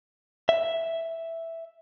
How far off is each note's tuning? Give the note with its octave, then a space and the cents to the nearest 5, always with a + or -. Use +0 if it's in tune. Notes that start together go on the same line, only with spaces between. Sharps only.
E5 +0